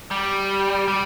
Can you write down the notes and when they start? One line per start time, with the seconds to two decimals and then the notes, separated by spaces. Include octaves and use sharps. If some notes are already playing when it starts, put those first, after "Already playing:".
0.11 G3
0.88 G3